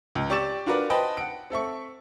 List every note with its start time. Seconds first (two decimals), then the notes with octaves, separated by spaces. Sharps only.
0.15 C#2
0.30 G4 D5 C#6 A6 E7
0.66 D4 F4 F#4 A#4 B4 D5
0.90 B4 C5 D#5 G5 A5 B5
1.17 F#5 D7
1.50 C4 A4 E5 C#6